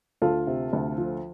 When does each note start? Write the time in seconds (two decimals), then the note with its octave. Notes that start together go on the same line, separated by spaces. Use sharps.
0.22 D2 F4 A4
0.47 C3
0.73 D2
0.98 F3